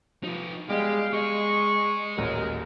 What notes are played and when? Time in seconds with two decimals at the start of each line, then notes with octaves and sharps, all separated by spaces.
0.23 F3 D#4 B4
0.69 G3 G#3 B3 G4 F5
1.14 G#3 G#4 D#5 C#6
2.18 D#1 A1 F#3 A#4